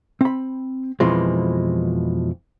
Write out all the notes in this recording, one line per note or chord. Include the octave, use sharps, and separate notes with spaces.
C4 B5
F2 B2 E3 F3 G#3